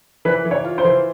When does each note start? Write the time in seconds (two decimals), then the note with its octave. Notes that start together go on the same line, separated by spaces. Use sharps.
0.25 E3 B4
0.45 E3
0.51 C#5
0.65 F4
0.78 C5
0.84 E3